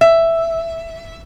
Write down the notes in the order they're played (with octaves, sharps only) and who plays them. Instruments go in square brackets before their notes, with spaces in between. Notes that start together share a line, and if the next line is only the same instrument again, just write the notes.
[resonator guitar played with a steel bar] E5